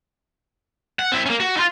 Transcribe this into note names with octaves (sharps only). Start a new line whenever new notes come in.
F#5
C4 E4
A#3 C#4
F#4
D#4 F4